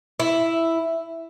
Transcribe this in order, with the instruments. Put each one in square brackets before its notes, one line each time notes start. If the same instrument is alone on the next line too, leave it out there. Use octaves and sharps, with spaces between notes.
[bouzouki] E4